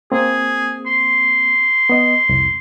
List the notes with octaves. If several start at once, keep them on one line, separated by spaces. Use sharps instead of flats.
A#3 C4 G#4
C6
B3 D#5
C2 F2